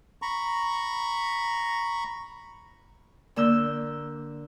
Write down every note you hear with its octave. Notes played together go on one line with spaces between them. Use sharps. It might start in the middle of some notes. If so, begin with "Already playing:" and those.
A#5 B5 C#6
D3 A#3 E6 G6